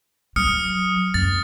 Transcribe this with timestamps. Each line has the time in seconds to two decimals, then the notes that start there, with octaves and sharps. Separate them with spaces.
0.36 F#3 D#6 F6 C#7
1.14 F#2 A6